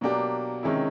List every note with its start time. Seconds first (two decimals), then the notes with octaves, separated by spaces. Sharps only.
0.01 B2 F#3 A#3 D4 G4
0.63 C3 D#3 G#3 C#4 E4